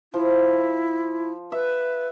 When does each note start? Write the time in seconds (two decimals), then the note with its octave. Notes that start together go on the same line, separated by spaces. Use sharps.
0.14 F3 E4
1.52 B4 E5